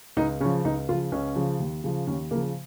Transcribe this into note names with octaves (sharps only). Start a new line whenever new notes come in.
C#2 D#4
C#3 F3 C#4
C#2 D#4
C#3 F3 F4
C#2 C#4
C#3 F3
D#2
C#3 F3
D#2 C#4
C#3 F3 A#3